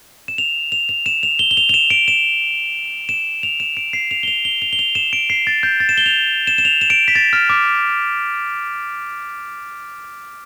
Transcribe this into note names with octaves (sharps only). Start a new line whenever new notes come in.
E7
F7
F7
F7
E7
F7
G7
G7
F7
F7
E7
D7
E7
E7
F7
E7
D7
C7
F7
G7
F7
G7
F7
G7
F7
E7
D7
C7
A6
G6
A6
E7
G7
F7
E7
E7
F7
E7
D7
B6
A6
F6
D6